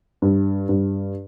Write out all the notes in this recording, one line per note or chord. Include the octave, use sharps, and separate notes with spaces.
G2
G2